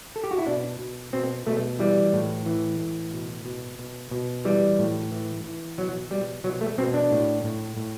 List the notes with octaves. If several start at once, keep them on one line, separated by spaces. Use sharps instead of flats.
A4
G4
F#4
E4
B2 D4
B2
B2 C4
B2 A3
E3 G3
A2
E3
A2
B2
B2
B2
B2
E3 G3
A2
E3
E3
B2 F#3
B2 G3
B2 F#3
A3
B2 C4
D4
A2
A2
A2